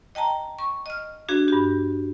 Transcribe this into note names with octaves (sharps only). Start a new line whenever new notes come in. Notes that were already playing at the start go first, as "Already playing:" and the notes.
D#5 G5 A5 A#5
C#6
D#5 F6
D4 F#4 G#4
G2 G4